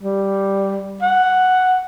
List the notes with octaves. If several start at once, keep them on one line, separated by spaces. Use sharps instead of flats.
G3
F#5